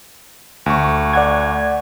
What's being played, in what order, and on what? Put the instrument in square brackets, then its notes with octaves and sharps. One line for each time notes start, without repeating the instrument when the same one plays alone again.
[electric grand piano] D2 C#6
[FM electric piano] D5 F#5 G#6